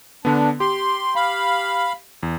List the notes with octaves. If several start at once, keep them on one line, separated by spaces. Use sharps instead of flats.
D3 B3 D4
G4 C6
F5 B5
E2